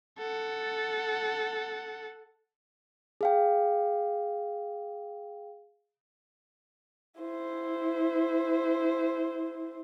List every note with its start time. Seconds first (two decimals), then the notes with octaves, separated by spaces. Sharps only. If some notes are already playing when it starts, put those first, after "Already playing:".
0.18 A4 F#5
3.21 G#4 F5 G5
7.19 E4 C5